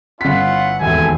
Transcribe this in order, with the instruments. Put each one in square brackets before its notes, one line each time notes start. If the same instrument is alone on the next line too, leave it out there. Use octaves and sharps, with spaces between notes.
[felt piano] G1 B6 [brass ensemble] C#4 E4 F#5 [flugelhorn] F4
[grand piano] E1 D#2 [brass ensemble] A4 E5 [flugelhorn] G#5